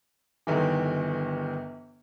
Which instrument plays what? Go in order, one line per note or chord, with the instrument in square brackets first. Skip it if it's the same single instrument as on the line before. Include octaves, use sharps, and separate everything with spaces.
[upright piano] G1 D#3 E3